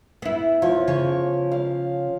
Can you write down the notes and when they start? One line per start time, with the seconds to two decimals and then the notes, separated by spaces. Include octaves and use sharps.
0.22 B3 E4
0.62 F3 C#5
0.88 C#3 C#4 C#5
1.52 F5